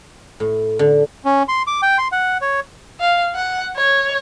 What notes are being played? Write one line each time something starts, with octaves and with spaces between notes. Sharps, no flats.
A2
D3
C#4
C6
D6
G5
C6
F#5
C#5
F5
F#5
C#5